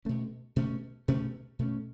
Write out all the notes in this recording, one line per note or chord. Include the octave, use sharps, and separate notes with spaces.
B2 A3 C#4
B2 A3 C#4
B2 A3 C#4
B2 A3 C#4